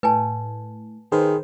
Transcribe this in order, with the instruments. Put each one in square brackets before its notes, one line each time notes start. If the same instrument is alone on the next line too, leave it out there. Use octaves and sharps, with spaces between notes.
[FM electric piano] A2 [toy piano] B4 G#5 A5
[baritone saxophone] D#3 [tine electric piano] G#4 [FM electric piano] B4 C5